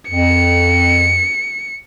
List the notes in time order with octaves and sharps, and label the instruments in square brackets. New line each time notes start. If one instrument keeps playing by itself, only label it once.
[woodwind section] F2 [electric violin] C#7